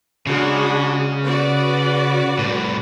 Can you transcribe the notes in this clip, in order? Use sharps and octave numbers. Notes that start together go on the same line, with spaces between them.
C#3 G#3 D4 F#4
F#4 B4 D5
C2 A2